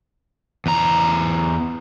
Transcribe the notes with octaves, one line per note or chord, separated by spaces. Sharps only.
E2 A#5